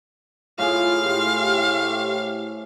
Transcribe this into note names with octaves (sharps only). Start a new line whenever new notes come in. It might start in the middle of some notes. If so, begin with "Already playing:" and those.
A2 F4 G#4 F5
A2 A3 G4 C5